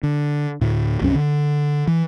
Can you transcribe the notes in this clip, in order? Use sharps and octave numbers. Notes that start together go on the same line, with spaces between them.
D3
D2 A2
C2 F#2 C3 C#4
D3
E3